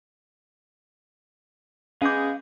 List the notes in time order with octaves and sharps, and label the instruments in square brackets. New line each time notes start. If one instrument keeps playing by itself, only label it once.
[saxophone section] G#3 B3 G#4 [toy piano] C#4 D6 [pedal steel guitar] F5 G6